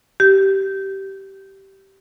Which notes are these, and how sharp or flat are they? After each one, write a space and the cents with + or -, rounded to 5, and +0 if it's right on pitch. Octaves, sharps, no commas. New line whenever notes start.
G4 -15